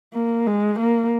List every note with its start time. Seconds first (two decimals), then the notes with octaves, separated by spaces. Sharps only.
0.14 A#3
0.47 G#3
0.80 A#3